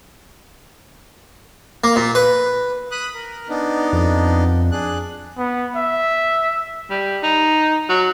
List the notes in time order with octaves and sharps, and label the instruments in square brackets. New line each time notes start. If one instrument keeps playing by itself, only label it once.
[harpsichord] A#3
A#2
B4
[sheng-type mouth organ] B5 D#6 F#6
A#4
B3 D4 D#4
[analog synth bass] F2
[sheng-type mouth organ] D4 G#4 F#6
[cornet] B3
E5
[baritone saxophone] G3
D#4
F#3